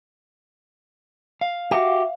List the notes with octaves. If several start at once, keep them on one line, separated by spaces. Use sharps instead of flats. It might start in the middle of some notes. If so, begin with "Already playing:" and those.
F5
F#4 G4 E5